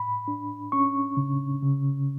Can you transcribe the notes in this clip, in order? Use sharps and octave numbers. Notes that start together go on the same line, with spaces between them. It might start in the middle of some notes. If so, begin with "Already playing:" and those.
Already playing: A2 B5
D4
C#4 C#6
C#3
C#3